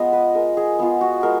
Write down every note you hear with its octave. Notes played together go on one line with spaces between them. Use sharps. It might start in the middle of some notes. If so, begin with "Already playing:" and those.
Already playing: G#3 B3 F4 D#5
B4
G#3 A#4
G#4
B3 F4 G#4
F#4
G#3 A#4